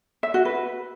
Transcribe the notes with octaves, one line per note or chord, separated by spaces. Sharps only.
E5
F#4
B4